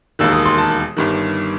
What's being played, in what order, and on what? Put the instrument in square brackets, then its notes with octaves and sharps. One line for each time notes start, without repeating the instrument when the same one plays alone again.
[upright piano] E1 D#2 D#3 E6
D#6
C6
A5
G1 G2 D#3